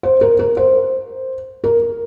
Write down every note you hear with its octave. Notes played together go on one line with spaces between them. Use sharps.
C5
A#4
A#4
C5
A#4